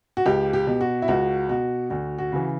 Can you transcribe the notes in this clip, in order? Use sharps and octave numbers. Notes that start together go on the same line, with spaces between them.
F#4
C#2 G4
G4
B2
F#4
E4
C#2 F#4
B2 F#4
D2 F#4
F#4
C#3 E3